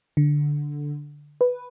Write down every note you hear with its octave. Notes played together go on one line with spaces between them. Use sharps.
D3
B4